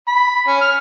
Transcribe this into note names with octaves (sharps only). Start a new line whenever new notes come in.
B5
C#4
F6